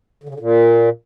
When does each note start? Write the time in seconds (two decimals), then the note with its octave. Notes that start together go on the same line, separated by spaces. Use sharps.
0.23 D3
0.29 C#3
0.34 D3
0.40 A#2